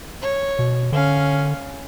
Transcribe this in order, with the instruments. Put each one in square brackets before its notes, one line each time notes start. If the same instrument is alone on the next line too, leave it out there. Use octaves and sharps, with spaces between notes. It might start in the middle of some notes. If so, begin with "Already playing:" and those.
[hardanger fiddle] C#5
[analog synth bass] B2
[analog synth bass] D3 [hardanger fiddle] C#4 F5